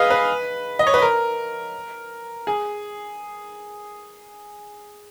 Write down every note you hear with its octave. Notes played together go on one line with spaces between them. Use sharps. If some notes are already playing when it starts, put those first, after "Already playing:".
Already playing: G#4 B4 D#5 F5
B4
D#5
C#5
B4
A#4
G#4